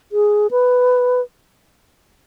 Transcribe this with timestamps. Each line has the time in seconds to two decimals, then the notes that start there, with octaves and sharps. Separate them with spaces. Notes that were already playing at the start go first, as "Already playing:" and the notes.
0.12 G#4
0.51 B4